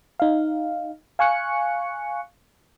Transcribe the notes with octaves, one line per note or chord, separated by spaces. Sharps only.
D#4 F5
F5 G#5 C#6 F#6 C#7